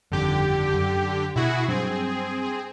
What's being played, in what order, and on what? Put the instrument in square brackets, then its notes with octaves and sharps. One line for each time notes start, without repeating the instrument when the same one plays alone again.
[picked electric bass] G1 F2 D#3 [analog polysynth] D3 G4
[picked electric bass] F#2
[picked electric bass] B2 [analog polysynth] E4 F#4 G#4
[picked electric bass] G2 F#3 D4 [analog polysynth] C4 G#4